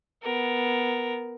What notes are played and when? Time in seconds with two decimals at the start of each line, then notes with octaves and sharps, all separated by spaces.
0.23 B3 A#4